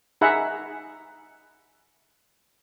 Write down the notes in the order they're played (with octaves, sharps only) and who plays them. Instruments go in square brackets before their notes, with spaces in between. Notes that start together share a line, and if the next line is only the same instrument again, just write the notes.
[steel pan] D#4 G#4 E5 F#5 A#5 B5